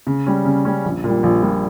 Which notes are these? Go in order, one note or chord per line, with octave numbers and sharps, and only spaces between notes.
C#3
G3 C#4
C#3
G3 C#4
A#1
A#2 G3
A#1
A#2 G3